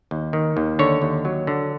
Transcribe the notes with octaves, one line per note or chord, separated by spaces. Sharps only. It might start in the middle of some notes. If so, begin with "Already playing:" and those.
D#2
D#3
D#2
D3 C#5
D#2
F#3
D3